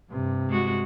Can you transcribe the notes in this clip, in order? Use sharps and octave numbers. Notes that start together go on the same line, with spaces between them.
G2 C3
G#3 F#4